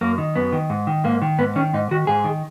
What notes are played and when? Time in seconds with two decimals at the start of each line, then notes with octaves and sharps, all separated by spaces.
0.01 F#2 A#3
0.18 D#3
0.36 F#2 B3
0.52 D#3
0.70 G#2
0.87 D#3
1.04 G#2 A#3
1.22 D#3
1.38 G#2 B3
1.56 D#3 C#4
1.74 G#2 D#4
1.91 D#3 F#4
2.07 G#2 G#4
2.25 D#3